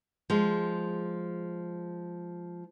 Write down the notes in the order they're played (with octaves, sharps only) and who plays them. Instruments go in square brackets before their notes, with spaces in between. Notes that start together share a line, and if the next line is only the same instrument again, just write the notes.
[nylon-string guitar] F3 G#3